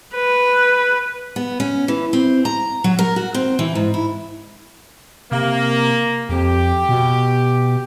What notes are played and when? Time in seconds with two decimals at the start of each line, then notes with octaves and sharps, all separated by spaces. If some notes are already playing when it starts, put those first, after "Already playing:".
0.15 B4
1.36 B3
1.60 C#4
1.88 E3
2.13 C4
2.45 A#5
2.84 F#3
2.99 A#4
3.16 F#4
3.34 C4
3.59 E3
3.75 G#2
3.94 E4
5.32 C3 A#3
6.29 F2 G4
6.89 B2